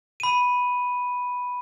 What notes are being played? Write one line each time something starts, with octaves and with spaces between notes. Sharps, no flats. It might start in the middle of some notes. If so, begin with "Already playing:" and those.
B5 D#7